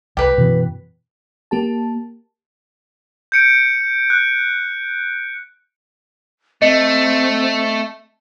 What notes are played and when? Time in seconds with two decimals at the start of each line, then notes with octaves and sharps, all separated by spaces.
0.17 C2 G4 B4
0.37 F#2 B2 E3
1.51 A#3 G4 A5
3.32 G6 C#7 D7
4.10 F#6
6.62 A3 C4 D#5 C#7